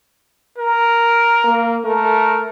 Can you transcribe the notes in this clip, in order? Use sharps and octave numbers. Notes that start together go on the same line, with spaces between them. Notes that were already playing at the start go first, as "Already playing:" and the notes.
A#4
A#3
A3 A#4